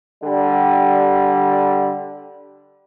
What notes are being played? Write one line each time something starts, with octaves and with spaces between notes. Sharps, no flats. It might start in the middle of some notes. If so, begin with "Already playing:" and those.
D3 G3